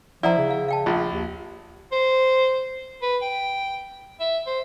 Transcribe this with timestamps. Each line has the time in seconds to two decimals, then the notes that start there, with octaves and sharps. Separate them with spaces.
0.23 F3 E4 D5 F#5 A#5
0.38 C#3
0.50 F5
0.68 F5 G5 A5
0.86 A#1 F4
1.13 D#2
1.92 C5
3.02 B4
3.22 G5
4.20 E5
4.46 C5